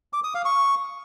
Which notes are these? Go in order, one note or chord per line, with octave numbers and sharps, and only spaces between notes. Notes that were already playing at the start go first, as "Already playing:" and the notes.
D6
D#6
F5
C#6